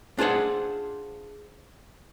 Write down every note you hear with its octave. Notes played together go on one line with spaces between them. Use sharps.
D4 F4 G#4 C5 F#5